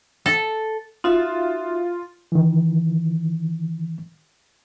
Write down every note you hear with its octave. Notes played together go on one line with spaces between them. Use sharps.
A4
D#4 F4 F#4 E5
D#3 E3